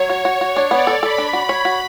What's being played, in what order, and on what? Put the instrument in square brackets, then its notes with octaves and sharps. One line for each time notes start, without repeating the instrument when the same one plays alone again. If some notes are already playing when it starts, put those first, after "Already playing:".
Already playing: [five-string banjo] F#3 [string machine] C#5
[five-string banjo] F#4
F#4
F#4
D4
[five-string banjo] B3 [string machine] D5
[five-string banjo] A4
[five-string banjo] A4 [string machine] B5
[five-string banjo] D4
F#4
C#5
F#4